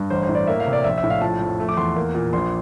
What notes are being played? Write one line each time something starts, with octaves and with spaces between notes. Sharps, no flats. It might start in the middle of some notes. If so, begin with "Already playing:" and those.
Already playing: G2
A1 C5
C5
A2
D5
A#3 E5
F5
C3
D5
A#1 E5
E5
A2
F5
F3 A5
F2
A3
D6
E2 C6
A#3
A#2
A#1 C6